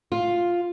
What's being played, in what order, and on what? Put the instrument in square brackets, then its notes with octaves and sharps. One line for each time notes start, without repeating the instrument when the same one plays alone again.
[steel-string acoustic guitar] F4